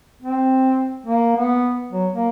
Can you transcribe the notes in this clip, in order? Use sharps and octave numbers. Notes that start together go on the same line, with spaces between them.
C4
A#3
B3
F#3
A#3